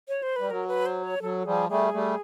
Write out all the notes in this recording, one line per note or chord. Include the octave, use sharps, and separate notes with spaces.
C#5
C5
G3 B4
F#3 A#4
B4
C5
C#5
F#3 A4
F3 G3 G#4
G3 A3 G#4
G3 A3